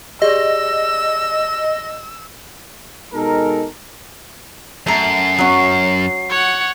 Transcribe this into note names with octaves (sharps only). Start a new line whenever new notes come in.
G4 G#4 D5 D#5 E6
B2 G#3 D#4 A4 A#4
F#2 A3 A#5 C7
F#3 C#4
C#5 F#5